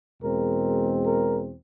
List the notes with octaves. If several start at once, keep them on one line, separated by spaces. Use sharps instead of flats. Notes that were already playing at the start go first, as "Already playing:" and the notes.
E2 B2 G#3 C4 A#4
A#4